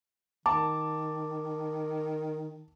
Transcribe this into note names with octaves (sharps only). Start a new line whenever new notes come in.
D#3 A5 D6